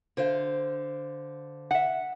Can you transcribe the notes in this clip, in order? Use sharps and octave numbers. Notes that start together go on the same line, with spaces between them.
D3 C5 F5
E5 F#5